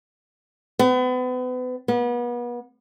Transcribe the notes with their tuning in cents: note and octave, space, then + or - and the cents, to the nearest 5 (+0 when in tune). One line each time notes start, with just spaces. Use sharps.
B3 +35
B3 -35